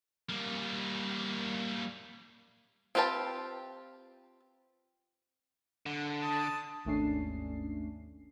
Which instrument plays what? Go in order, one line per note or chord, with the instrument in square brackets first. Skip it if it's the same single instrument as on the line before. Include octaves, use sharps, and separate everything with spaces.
[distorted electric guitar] G3 A#3
[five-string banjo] C4 F4 G4 B4 A5
[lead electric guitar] D3
[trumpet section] A5 D#6
[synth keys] G#1 D#2 A3 C#4 D4 C7